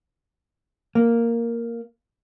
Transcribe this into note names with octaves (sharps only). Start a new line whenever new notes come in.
A#3